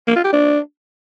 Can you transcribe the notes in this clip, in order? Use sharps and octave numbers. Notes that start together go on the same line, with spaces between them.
A#3
F4
G4
D4